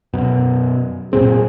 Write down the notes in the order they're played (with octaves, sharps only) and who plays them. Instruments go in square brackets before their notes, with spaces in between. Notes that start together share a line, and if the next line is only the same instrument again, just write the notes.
[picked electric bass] F#2 B2
[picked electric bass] F#2 A#2 C4 [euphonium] G#4